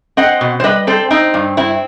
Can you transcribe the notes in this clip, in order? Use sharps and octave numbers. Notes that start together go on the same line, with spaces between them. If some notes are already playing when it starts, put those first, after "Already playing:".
C4 D#5 F#5
B2
C5
G3 B4 D#5
C4 A4 C5
C4 D#4
G2
C4 E4